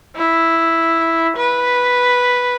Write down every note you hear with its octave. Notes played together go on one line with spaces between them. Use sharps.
E4
B4